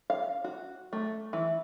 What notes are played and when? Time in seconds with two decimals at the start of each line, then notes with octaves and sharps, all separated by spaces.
0.10 F5
0.44 F#4
0.93 A3
1.33 E3